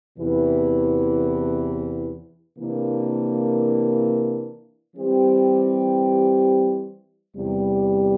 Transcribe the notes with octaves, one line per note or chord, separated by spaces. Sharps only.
E2 C3 E3
C3 E3 A#3 D4
E3 G3 C4 G4
E2 C3 G3